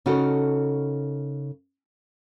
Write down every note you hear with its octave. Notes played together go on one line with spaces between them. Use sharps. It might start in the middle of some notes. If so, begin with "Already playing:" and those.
C#3 D#4 F#4 A4 A#4